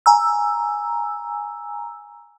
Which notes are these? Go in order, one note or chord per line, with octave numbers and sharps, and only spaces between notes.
G#5 A#5 E6